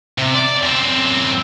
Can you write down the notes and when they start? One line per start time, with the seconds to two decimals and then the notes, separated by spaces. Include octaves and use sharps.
0.18 C3
0.34 D5
0.63 F#2 C4